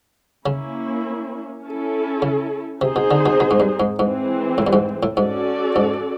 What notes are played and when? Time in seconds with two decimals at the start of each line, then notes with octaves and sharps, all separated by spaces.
0.46 C#3 A#3 C#4 E4
1.63 C#4 E4 A4
2.22 C#3
2.81 C3 C4 D#4 G#4 C5
2.96 B2
3.11 D3
3.26 B2
3.40 B2
3.51 G#2
3.60 G2
3.80 G#2
3.99 G#2 E3 G#3 C4
4.58 A2
4.67 G2
4.73 G#2
5.03 A2
5.17 G#2 C#4 F#4 A4 D5
5.76 G#2